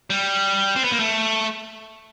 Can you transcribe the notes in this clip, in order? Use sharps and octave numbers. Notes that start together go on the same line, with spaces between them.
G3
C4
B3
A#3
A3